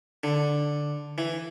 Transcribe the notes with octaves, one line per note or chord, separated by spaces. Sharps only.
D3
E3